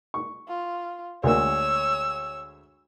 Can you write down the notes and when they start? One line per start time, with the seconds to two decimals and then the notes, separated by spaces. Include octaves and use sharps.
0.14 C#6
0.48 F4
1.23 D2 G#3 A#3 C#5 E6